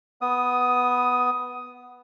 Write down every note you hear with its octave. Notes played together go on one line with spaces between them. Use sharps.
B3 D#6